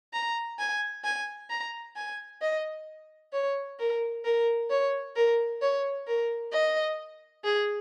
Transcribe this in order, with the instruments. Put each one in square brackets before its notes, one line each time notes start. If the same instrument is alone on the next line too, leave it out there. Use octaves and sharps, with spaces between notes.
[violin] A#5
G#5
G#5
A#5
G#5
D#5
C#5
A#4
A#4
C#5
A#4
C#5
A#4
D#5
G#4